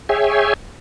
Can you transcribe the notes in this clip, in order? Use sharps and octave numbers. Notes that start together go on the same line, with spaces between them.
G#4 C#5 E5 G5 G#5